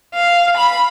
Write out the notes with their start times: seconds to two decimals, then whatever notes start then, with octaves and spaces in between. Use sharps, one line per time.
0.15 F5
0.57 B5